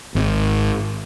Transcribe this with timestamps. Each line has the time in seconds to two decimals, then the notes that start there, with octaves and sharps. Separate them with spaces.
0.15 G#1